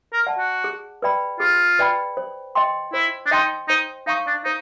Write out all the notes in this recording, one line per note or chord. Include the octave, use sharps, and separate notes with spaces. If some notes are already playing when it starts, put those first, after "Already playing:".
A#4
D5 F#5 A5
F#4
G#4
B4 D5 G5 B5
F4 G#4
B4 D5 G5 B5
C5
D#5 G5 C6
E4 C5
D4
D#4 D#5 G5 C6
D#4 C5
D#4 F5 A#5 C#6
D4
D#4 C5